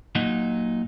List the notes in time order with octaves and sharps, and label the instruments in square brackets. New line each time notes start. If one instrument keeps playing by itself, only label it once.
[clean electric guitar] A#2 F#3 D#4